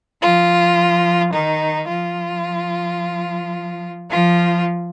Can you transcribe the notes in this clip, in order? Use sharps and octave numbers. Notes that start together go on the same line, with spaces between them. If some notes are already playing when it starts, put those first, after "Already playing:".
F3 F4
D#3 D#4
F3 F4
F3 F4